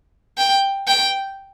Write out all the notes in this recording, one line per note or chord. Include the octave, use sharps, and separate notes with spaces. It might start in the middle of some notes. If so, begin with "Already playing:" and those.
G5
G5